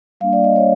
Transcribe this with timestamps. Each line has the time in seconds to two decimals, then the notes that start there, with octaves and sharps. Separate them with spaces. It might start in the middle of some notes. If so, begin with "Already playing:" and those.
0.21 G3 A#3 D4 F5
0.33 D5
0.44 D#5
0.56 C#5